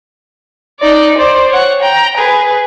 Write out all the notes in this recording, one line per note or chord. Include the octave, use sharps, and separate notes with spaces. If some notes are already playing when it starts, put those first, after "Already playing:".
D#4 D5
C5 D5
C#5 F#5
G5 A#5
G#4 B4